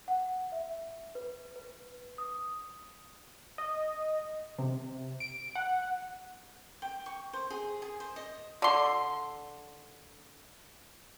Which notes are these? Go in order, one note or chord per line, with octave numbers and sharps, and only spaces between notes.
F#5
E5
B4
B4
D#6
D#5
C3
D7
F#5
G5
C#6
C5
G#4
G#4
C5
D#5
D3 C6